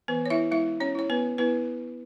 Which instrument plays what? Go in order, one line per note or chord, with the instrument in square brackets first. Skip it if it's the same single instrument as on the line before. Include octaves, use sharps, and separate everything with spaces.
[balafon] E3 B3 B4
C#5
E4 E5
G#3 E4 E5
C#4 C#5
E4 C#5
B3 B4
B3 E4 B4